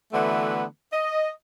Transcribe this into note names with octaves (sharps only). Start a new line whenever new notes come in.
D3 E3 A3 B3 F#4 B4
D#5